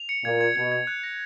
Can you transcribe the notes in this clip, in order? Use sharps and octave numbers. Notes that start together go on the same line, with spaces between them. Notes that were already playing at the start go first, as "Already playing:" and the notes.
Already playing: F7
C#7
A#2 G#6
G#6
B2 G#6
G#6
F#6
A#6